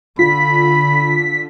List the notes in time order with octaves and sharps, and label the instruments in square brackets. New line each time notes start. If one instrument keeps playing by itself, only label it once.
[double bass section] D3 [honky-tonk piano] F4 [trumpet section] B5 [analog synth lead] B6